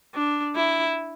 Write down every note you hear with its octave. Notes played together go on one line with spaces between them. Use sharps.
D4
E4